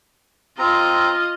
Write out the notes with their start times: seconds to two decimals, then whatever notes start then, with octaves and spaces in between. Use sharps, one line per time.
0.58 C4 F4 D#5 A#5